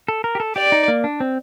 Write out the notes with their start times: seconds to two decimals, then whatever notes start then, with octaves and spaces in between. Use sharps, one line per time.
0.08 A4
0.24 A#4
0.35 G4
0.40 A4
0.56 G4 D5
0.72 D#4
0.88 A#3
1.04 D4
1.20 C4